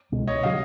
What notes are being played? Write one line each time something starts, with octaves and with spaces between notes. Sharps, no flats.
C#2 B2 G#3
C#5 D#5
C#3 F#3 D#5 F5